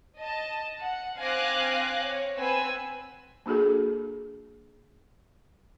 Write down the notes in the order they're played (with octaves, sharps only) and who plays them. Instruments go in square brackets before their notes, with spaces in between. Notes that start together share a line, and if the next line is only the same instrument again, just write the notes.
[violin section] D#5 A5
F#5
C4 F5 G#5 D6 F#6 A#6
C#5
B3 C4 B4 C5 G#5 E6
[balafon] A#3 D4 F#4 G#4 A4